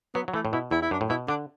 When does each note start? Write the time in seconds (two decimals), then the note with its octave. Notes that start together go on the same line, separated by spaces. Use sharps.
0.15 F#3 B3
0.28 F#3
0.34 E3 A3
0.45 A2
0.53 B2 E4
0.71 E2 E4
0.82 E4
0.91 F#2 D4
1.01 A2
1.09 B2 E4
1.28 D3 D4